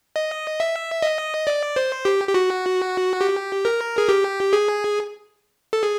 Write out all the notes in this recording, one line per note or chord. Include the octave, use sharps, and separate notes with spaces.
D#5
E5
D#5
D5
C5
G4
G4
F#4
G4
A#4
G#4
G4
G#4
A4
G#4